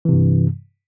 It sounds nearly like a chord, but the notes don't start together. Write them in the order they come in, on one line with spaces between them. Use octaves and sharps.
E3 C3 G2